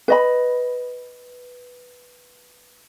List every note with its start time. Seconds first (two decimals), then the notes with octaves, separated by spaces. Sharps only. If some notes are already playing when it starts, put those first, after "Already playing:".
0.08 B4 D#5 B5